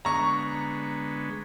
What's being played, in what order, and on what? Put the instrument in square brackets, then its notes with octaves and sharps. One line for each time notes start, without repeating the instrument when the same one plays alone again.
[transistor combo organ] D3 G#3 B3 [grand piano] A#5 C#6